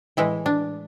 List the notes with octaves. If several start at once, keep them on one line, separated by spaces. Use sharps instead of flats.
A2 E3 G#3 E4
D4